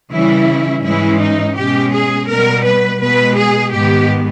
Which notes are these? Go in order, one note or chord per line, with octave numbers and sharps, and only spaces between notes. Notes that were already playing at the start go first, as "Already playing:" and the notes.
C#3 E3 G3 C#4 E4
G#2 E3 G#3 C#4 E4
D#4
B2 G#3 C#4 G4
G#4
B2 G3 B3 A#4
B4
B2 G#3 B3 B4
G#4
G#2 D#3 G#3 B3 G4